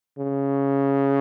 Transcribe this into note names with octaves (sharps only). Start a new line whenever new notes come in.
C#3